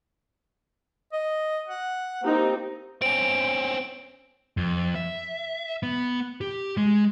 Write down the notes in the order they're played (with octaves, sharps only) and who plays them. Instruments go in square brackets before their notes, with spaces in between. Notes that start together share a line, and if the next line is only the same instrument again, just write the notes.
[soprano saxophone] D#5
F#5
[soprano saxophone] A#3 [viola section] C4 D#4 G4
[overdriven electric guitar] C4 C#4 [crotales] D7
[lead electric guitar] F2
E5
B3
G4
G#3